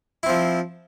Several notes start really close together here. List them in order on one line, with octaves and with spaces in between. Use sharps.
E4 C4 F3